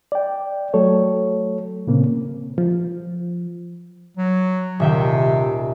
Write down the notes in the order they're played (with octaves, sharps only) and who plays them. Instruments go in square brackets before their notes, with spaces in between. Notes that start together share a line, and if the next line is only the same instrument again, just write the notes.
[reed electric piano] D5 G5
F#3 A3 A4 C#5
A#2 C#3 A#3 C4
[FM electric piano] F3
[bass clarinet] F#3
[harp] D#1 E5 G5 [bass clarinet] C3